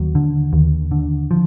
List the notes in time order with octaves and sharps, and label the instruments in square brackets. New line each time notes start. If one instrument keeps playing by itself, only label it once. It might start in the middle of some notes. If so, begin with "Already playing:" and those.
Already playing: [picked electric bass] D#2 F#3
D3
D#2
D3
F3